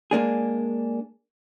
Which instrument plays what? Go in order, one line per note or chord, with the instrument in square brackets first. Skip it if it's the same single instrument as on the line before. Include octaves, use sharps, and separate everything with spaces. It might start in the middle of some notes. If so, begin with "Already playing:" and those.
[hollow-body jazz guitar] G#3 A#3 D4 G#4